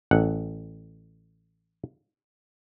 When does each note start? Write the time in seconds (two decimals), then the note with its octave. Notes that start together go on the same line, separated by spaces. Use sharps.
0.11 A1 F#5